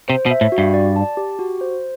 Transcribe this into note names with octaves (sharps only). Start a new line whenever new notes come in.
C3 C5
B2
E5
A2
F#4
G2
D5
A5
G4
F#4
C5